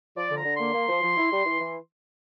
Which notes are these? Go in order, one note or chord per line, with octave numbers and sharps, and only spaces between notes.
F3 D5
D3 A#5
D3
A#3 C6
A#3
F3
F3
E4
G3
E3
E3